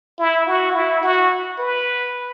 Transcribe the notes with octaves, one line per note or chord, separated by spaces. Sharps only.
E4
F#4
E4
F#4
B4